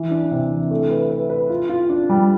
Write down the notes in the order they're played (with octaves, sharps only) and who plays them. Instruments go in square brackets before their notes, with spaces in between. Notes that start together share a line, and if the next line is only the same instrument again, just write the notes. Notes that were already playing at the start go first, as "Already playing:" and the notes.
Already playing: [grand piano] E3
D4
C3
E3
A3
B4
B4
B4
F4
F4
D4
G3